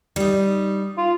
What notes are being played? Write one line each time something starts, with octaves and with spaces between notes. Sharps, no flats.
G3 D#4
F4